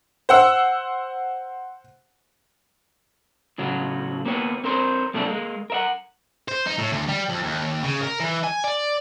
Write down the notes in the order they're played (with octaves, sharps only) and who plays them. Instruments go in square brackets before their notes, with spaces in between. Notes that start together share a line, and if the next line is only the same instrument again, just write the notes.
[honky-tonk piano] C5 F#5 E6
[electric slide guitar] A2 C#3 F#3
A#3 B3 G4 C#5
C4 A#4 C5 C#5
F#2 C3 A3 A#3 C#4 D4
G#3 A#3
A#4 E5 F#5
[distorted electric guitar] C5
D#4
A2
D2
G3
F2
D#2
C#3
A#4
E3
G#5
D5